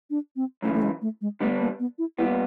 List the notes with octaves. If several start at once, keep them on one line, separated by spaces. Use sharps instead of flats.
D4
C4
F#2 C#3 E3 A3
A3
G#3
A3
G#3
D3 G3 A3 B3 D4
A#3
B3
E4
A#2 G3 B3 E4